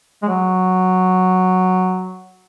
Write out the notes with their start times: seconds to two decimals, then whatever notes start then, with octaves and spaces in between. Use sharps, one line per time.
0.22 G#3
0.28 F#3